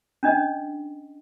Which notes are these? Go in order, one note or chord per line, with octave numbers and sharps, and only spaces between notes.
C#4 D4 D#5